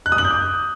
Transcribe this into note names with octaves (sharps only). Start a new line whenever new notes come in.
F#6
D#6
F#7
G6
D6